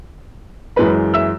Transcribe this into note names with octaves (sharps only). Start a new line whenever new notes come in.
F#2 E3 G#3 B4 B5
E5 E6